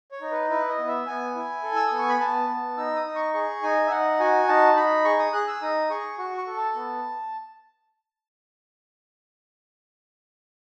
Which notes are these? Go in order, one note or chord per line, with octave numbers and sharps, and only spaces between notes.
C#5
D#4
B4
E4 B4
D#5
B3
E5
B3 G#5
E4
A4
E6
B3 D#6
C#6
B5
B3 A5
B3
D#4 E6
D#6
D#4
C#6
G#4 C#6
D#4 G#5
E5
D#4 F#5
F#4 G#5
D#4 A5
D#4 B5
G#4 C#6
D#6
G#4 F#6
E6
D#4 D#6
G#4 C#6
F#4 C#6
C#6
A4
A5
B3